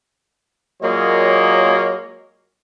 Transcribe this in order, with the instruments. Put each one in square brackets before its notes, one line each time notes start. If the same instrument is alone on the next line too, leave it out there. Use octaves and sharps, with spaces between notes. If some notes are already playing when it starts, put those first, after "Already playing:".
[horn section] A#2 F#3 G#3 A#3 C#5 D#5